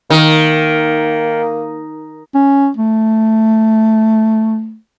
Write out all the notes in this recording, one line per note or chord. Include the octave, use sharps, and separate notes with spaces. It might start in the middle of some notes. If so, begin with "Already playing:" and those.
D#3 A#3
C#4
A3